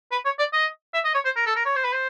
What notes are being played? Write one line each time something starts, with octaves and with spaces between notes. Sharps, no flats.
B4
C#5
D5
D#5
E5
D#5
C#5
C5
A#4
A4
A#4
C#5
C5
B4
C5